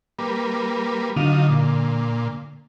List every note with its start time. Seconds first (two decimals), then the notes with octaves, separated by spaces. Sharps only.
0.19 G3 A#3 B4
1.16 D3 F#3 D#4 F4
1.49 A#2